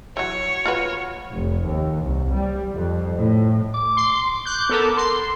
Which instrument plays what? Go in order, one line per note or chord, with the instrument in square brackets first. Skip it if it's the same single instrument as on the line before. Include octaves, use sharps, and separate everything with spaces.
[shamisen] E3 F#3 [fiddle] C#5
[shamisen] F4 F#4 B4
[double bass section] F1
D#2
C2
G3
F2
A2
[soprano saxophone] D6
[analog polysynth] C6
F#6 G6
B3 A4 A#4
C6